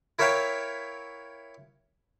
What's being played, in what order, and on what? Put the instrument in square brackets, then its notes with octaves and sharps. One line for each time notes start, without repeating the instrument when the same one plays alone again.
[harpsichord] E4 A#4 C#5 E5 F5 G5